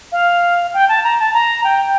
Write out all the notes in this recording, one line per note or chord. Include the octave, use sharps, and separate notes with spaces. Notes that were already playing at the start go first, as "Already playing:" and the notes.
F5
G5
A5
A#5
A5
A#5
G5